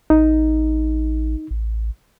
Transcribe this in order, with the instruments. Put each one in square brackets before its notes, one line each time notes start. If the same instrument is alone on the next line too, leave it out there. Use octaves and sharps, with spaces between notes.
[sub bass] A1 [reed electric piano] D#4
[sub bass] A1